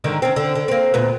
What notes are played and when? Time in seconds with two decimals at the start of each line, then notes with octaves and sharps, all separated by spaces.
0.04 G#2 D3 D#3
0.22 C4 C#4
0.36 D3
0.55 D3
0.68 A#3 C4
0.94 D2 A#2 B3